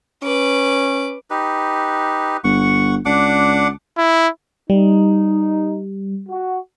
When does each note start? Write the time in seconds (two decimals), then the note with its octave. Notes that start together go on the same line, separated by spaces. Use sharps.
0.23 C#4 B4 D6
1.30 D#4 G4 B4
2.44 G1 F#5 C#6
3.05 C#2 D4 F#5 D6
3.97 E4
4.70 G3 D#4
6.29 F#4